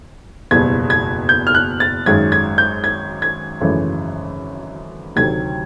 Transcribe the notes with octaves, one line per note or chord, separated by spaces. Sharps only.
F#1 E2 B2 G3 G#6
G#6
G6
F6
F#6
A6
G#1 F#2 D#3 G#3 G#6
G#6
G6
G#6
G#6
G#1 F#2 C#3 E3 A3
D2 C3 D#3 F#3 G#6